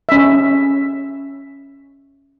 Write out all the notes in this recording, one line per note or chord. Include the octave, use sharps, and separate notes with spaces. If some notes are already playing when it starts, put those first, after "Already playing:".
C#4 E5